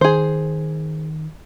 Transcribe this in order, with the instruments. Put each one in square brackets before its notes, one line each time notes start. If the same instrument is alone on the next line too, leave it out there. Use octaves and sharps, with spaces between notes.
[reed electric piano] D#3 [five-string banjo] G#4 C5